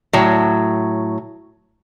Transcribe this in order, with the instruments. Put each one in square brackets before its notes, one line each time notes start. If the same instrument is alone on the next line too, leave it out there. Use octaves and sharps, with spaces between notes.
[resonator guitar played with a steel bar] A2 F#3